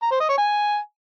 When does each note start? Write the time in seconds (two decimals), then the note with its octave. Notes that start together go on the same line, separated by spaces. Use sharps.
0.02 A#5
0.11 C5
0.20 D#5
0.29 C#5
0.38 G#5